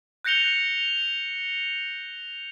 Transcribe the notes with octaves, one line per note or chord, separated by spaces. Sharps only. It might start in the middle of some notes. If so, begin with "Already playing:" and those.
F#6 G6 A#6 C#7 F7 G7